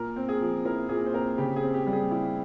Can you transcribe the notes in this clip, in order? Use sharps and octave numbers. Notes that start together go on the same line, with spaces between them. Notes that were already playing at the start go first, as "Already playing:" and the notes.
Already playing: A#2 A#4
C4
G#4
F3
E4 A#4
A#2 G#4
C5
C4 A#4
C#3 G4
G#4
C4
G4
G3
G#4
E4